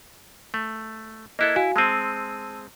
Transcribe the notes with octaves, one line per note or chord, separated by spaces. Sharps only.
A3
A#3 E4 A4 D#5 F#6 G#6
E4 F#4 F5 G#5
G#3 C4 A5 E6 D#7